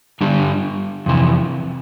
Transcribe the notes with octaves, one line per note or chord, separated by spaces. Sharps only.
G2 D3 G3 D4
F2 C3 E3